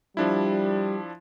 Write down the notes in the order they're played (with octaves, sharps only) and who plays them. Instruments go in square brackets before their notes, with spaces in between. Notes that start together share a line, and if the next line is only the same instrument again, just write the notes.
[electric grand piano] F3 D4 E4 [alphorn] G3